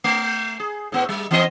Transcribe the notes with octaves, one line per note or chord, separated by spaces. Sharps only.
A3
G#4
A2 B3
G3
E3 C4 D#5